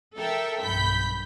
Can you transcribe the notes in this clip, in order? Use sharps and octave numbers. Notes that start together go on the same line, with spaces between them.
A4 A#4 E5 G5
B1 G2 B5 G6 B6